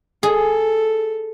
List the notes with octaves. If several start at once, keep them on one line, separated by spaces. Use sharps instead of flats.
G#4 A4